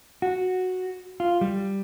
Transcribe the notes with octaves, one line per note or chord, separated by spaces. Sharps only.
F#4
F4
G3